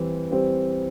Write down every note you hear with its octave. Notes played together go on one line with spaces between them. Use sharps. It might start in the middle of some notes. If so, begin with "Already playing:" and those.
Already playing: E3 G3 C4
G3 C4